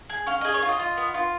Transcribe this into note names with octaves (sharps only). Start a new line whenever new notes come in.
G#4
C#4 F5
G#4 D#5
C#5
F4
D#5
F4
B3
F4